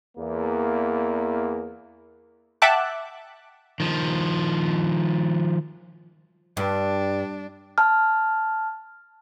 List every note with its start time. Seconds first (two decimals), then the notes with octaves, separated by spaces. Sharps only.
0.18 E2 A#3
2.62 E5 F#5 G5 A5 D6 F#6
3.80 D#3 F3
6.57 G2 D4
7.78 A5 F6